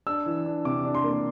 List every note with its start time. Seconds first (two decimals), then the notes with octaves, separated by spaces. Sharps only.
0.07 D4 E6
0.26 E3
0.46 D4
0.65 C3 D6
0.85 D4
0.95 C6
1.04 A#3